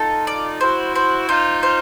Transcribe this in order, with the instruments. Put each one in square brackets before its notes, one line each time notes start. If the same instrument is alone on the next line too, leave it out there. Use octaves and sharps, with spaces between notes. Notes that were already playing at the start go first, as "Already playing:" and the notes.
Already playing: [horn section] D#4 F4 [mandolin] A4
[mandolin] D5
[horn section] E4 F#4 [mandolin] C5
[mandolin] C5
[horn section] D#4 F4 [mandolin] C5
[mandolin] C5